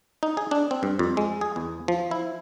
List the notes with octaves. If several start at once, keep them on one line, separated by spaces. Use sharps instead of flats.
D#4
G#4
D4
C4
G2
F2
G#3
G#4
E2
F3
E4